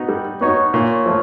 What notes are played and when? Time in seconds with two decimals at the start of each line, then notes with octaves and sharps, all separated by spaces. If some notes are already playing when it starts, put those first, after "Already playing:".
Already playing: B3 D#4 F#4
0.09 G3
0.41 B3 D#4 F#4 C#5
0.74 A#2 C#5
1.06 F3 A3